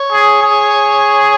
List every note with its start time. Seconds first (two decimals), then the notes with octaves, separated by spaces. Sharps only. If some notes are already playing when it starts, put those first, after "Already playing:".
Already playing: C#5
0.12 G#4
0.42 G#4